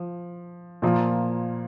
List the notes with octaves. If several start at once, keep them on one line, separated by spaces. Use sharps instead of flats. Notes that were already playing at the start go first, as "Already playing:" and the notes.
Already playing: F3
A#2 F3 A#3